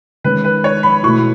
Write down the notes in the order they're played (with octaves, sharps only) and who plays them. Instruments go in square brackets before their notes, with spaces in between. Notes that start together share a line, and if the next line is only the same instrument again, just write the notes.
[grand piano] D#3 G#3 C#4 [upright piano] B4
[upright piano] B4
C#5
B5
[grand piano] B2 A3 E4 [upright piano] C#6